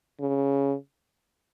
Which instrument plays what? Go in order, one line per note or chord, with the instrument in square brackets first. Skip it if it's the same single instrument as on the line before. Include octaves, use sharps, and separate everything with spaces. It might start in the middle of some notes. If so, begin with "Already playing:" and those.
[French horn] C#3